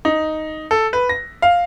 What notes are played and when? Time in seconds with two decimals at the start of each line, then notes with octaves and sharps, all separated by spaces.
0.05 D#4
0.71 A4
0.93 B4
1.09 A#6
1.42 F5